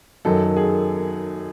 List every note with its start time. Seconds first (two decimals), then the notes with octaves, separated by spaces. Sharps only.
0.25 F#2 D#3 F#3 A4
0.44 A4
0.56 G#4
0.64 A4